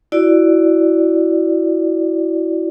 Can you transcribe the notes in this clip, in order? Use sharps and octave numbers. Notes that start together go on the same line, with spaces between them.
E4 F#4 D5